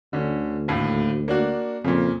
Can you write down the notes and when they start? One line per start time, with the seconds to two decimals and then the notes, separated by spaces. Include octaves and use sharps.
0.13 D2 D3 C#4
0.68 D#2 A2
1.28 A#3 D4 F#4
1.84 F2 A#2 C#3